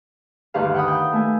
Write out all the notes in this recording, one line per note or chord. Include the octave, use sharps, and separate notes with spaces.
D2 G2 D#3 G4 B4 F5
F#5 G5 B5 D#6
G5 G6
A3 G#5